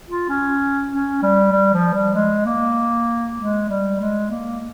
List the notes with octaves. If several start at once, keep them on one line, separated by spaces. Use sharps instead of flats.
F4
C#4
C#4
G3
G3
F3
G3
G#3
A#3
G#3
G3
G#3
A#3